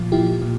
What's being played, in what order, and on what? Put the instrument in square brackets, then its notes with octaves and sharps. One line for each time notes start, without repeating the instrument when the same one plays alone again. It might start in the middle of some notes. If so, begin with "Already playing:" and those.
Already playing: [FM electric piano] A#2 F3 F4
A#2 F3 E4 G4
A#2